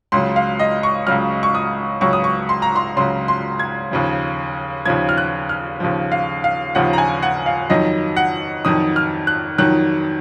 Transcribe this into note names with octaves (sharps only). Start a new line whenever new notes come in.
C#2 C#3 F#3 C6
F5
D#5
C#6
C#2 C#3 F#3 F6
C#6
D#6
C#2 C#3 F#3 C#6
D#6
C#6
C6
A#5
C6
C#2 C#3 F#3 C6
C6
G#6
D#2 C#3 F3
D#2 C#3 F3 G#6
F6
F#6
F6
D#2 C#3 F3
F5
F5
D#2 C#3 F3 F#5
A#5
G#5
F#5
F5
F2 D#3 F#3 D#5
F#5
F2 D#3 F#3 D#6
F6
F#6
F2 D#3 F#3 F#6